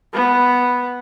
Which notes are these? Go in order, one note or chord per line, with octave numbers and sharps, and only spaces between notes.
B3